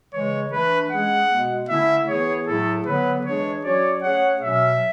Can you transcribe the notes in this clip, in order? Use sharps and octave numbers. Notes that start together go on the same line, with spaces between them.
C#3 E3 G#3 C#5
E3 A3 D4 B4
G#3 C#4 G#4 F#5
B2 G#3 B3
D3 A3 C#4 E4 E5
E3 B3 E4 G#4 C#5
A2 F#3 A3 E4 G#4 A4
D3 F#3 B3 B4
E3 G#3 D4 G#4 C#5
F#3 C#4 F#4 C#5 D5
A3 C#4 G#4 C#5 F#5
B2 F#3 C#4 E5